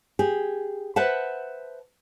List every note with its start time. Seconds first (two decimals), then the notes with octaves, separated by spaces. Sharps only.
0.19 G4 G#4
0.96 B4 C5 E5 F#5 A5